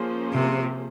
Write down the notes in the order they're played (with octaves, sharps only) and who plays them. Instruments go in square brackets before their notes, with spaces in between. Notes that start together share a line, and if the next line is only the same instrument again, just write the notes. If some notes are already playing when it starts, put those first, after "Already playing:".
Already playing: [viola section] F3 A#3 C#4 G#4 C5
[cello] C3